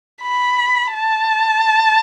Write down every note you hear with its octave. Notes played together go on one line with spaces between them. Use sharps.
B5
A5